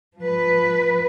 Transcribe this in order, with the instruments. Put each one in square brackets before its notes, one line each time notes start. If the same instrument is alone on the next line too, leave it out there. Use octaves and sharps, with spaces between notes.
[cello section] F3 B4